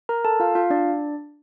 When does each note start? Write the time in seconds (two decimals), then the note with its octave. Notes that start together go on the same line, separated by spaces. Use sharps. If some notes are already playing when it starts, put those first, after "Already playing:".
0.09 A#4 A#5
0.25 A4 A5
0.40 F4 F5
0.55 F4 F5
0.70 D4 D5